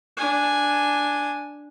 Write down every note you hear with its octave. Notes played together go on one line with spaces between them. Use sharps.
D4 G#5